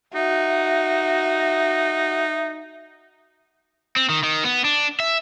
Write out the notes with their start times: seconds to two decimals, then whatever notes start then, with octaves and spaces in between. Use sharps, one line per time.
0.15 D#4 F#4 E5
3.96 C4
4.09 D#3
4.23 D#3
4.44 B3
4.65 D4
5.00 E5